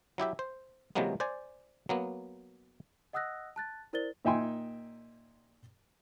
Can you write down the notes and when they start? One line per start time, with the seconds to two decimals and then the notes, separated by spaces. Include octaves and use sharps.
0.18 F#3 E4 G4 E5
0.39 C5
0.95 C3 E3 F#3 G#3 A#3 B3
1.20 C5 D5 G#5
1.89 F#3 A#3 B3
3.13 D#5 F#5 D#6 E6 F#6 A#6
3.56 A5 F#6 A6
3.93 E4 A#4 C5 D5 A6 G7
4.25 A#2 D#4 E5 G5 G#5 C6